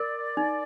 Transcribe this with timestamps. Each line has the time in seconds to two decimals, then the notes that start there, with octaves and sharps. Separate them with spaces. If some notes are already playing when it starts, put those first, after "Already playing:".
Already playing: A#4 D5
0.37 D#4